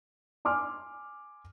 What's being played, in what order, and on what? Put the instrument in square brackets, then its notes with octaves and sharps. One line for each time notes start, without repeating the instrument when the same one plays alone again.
[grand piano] G#5 C6 D6 F6